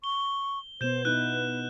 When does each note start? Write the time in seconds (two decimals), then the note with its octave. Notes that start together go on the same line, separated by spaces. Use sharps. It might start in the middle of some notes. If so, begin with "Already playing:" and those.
0.04 C#6 G7
0.81 B2 B3 C5 G6 E7
1.05 B3 D#4 E4 B4 F#6